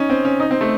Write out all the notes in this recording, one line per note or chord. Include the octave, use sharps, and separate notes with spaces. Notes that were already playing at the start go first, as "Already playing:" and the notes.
Already playing: C#4 D#4
C4
C#4
D#4
C4
A3